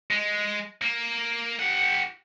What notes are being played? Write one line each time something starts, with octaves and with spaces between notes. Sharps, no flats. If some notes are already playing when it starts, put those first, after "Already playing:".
G#3
A#3
G4 F#5